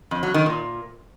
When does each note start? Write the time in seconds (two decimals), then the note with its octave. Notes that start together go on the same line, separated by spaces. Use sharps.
0.11 F2
0.23 F#3
0.34 D#3
0.46 A#2